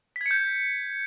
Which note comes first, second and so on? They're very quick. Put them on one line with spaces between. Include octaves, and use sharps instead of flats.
B6 G#6 C#7 G6